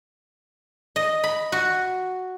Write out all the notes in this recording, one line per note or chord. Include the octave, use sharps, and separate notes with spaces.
D#5
B5
F#4